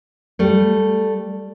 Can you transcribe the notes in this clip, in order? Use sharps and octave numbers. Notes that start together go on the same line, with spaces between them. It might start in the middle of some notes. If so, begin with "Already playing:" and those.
G3 A3